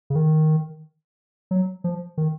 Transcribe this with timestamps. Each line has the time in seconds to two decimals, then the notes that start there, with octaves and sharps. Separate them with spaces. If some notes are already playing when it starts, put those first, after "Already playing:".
0.10 C#3
0.16 D#3
1.51 F#3
1.84 F3
2.18 D#3